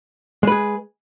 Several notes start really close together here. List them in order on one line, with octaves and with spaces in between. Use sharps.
G#3 B4 G#4